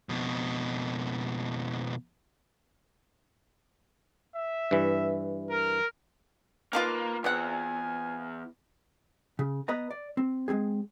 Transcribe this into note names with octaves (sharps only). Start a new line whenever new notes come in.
F2 B2
E5
G2 E3
A#4
F3 A#3 D#4 F4 B4 F5 D6
E2 B3 C4 F#5 G#5
C#3
B3 B4 D#5 A#5
D5
C4
G#3 A#3 C4 G#4